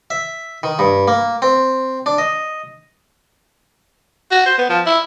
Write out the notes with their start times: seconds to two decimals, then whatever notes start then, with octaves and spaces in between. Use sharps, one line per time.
0.10 E5
0.63 D#3
0.79 G2
1.08 A#3
1.42 C4
2.06 D4
2.18 D#5
4.31 F#4
4.46 C5
4.58 B3
4.70 F3
4.86 E4